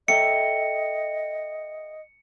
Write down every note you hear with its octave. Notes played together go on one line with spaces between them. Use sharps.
A4 D#5 E5 G5 C#7